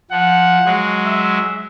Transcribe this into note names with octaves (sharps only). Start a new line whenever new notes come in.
F3 F#5
F#3 G#3
E5